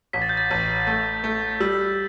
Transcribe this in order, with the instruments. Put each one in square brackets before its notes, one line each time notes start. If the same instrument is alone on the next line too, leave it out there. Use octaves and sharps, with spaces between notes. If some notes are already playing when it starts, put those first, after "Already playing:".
[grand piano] A1 [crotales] B6
[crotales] A6
G6
A6
[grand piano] A1
A3
A3
[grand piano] G3 [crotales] E6